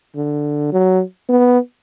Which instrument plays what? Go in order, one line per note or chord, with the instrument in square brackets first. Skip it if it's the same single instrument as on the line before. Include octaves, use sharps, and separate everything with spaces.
[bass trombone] D3
F#3
B3